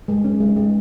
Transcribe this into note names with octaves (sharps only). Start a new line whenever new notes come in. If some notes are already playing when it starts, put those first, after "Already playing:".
G#3
C#4
G#3
G#3